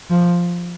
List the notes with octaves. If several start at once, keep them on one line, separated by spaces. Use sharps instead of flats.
F3